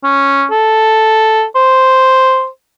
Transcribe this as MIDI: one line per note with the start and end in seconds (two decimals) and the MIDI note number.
0.04 0.46 61
0.51 1.44 69
1.55 2.47 72